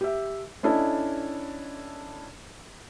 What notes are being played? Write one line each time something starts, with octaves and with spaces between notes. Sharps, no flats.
G4 E5
C#4 D4 E4 A4 D#5